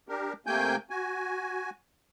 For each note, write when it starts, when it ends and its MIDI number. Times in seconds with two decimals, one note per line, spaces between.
0.09 0.33 62
0.09 0.33 67
0.09 0.33 70
0.47 0.76 48
0.47 0.76 57
0.47 0.76 58
0.47 0.76 79
0.47 0.76 80
0.47 0.76 91
0.90 1.70 66
0.90 1.70 80